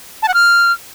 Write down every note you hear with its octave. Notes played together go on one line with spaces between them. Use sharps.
A5
F#5
F6